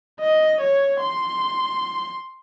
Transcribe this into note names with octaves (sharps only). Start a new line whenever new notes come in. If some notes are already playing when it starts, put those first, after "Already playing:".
D#5
C#5
C6